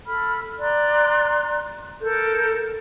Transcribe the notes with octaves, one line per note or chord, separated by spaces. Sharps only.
A4 B5 F6
D5 A#5 C6 F#6
A4 A#4 G6